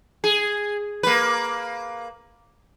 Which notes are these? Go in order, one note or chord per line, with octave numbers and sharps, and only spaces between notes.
G#4
A#3 B4